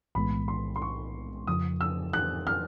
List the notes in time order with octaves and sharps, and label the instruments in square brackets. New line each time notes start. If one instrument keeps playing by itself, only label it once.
[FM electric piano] B1 A2 E3 G#3 B3 [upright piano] B5
[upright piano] C6
C6
C#6
[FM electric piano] F2 C#3 F3 [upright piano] D#6
[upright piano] E6
F#6
F6